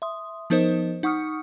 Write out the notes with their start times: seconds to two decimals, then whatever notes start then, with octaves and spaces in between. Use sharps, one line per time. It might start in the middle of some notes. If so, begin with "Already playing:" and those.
0.02 E5 C6 D#6
0.50 F3 B3 D#4 A#4 C5 D#5
1.03 D#4 F#5 C#6 D#6 F6 C#7